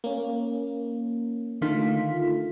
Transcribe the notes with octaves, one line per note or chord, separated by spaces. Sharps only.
A#3 C#4
D3 D#3 A3 F4 B6